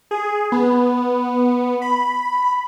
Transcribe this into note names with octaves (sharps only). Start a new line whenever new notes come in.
G#4
B3
B5